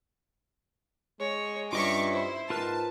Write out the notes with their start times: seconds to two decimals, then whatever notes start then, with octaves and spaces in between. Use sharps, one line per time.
1.20 G#3 C#5
1.73 G2 C#4 F4 C#5 D#5 E5 C#6 D6
2.12 E4 C5
2.50 G#2 F4 A#4 B4 A5